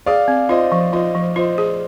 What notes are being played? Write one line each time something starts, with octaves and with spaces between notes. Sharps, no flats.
G#4 D5 F5
C4
F4 C5 D#5
F3
F4 C5 D#5
F3
F4 C5 D#5
G#4